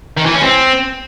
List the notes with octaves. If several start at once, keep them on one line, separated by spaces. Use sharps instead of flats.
D#3
E3
C#4
C4